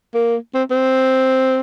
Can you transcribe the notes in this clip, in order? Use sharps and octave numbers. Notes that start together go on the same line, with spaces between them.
A#3
C4
C4